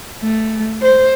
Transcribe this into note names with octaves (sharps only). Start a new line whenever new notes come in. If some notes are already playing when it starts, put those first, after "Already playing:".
A3
C5